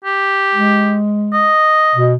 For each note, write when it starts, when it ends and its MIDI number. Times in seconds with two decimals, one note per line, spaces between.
0.05 0.98 67
0.55 1.51 56
1.33 2.10 75
1.95 2.14 47